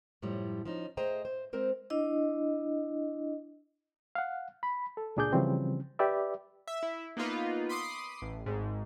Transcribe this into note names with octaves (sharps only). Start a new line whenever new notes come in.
F#2 A2 F3 G3
F3 C#4 D#4
A3 G#4 C5 D#5 G5 A#5
C5
G#3 C4 A#4 C5
D4 E4 D#5
F5 F#5
B5
A4
C#2 A#2 D4 G#4 D5 G6
C#3 E3 F3 G3 C4 C#4
G4 B4 D5 E5
E5
E4
A#3 B3 D#4 F4 B4
B5 C6 D6 D#6 C7
A1
G#1 G#2